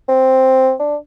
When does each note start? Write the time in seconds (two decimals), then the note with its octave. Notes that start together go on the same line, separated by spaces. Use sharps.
0.09 C4
0.80 D4